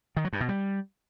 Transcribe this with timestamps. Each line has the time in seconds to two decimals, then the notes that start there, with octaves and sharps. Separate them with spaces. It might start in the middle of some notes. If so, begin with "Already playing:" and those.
0.17 D#3
0.25 F#3
0.33 G2
0.41 B2
0.49 G3